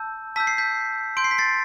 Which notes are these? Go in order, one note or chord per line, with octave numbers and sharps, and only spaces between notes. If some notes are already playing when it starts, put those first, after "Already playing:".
Already playing: A5 E6 G6
A5 E6 G6 B6
C7
G6 B6
C6 G6 D7
C7
B6
A6 C7